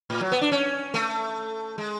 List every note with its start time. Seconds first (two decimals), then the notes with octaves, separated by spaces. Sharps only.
0.10 A2
0.21 F#3
0.32 B3
0.41 D4
0.52 C#4
0.94 A3
1.78 G#3